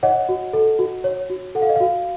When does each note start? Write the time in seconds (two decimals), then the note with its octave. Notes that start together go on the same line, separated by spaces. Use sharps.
0.03 C#5 D#5 F#5
0.29 F#4
0.53 A4
0.79 F#4
1.04 C#5
1.30 F#4
1.55 A4 F#5
1.62 F5
1.69 D#5
1.76 F#4 F5